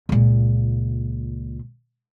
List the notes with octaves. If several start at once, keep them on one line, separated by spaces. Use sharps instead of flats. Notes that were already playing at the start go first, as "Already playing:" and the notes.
C#2 A#2